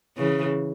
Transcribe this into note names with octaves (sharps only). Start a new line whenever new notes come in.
C#3 E3